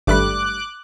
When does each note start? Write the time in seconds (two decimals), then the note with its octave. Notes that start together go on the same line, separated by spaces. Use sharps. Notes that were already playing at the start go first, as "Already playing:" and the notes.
0.07 G#1 G2 G3 A3 B5 D6 F#6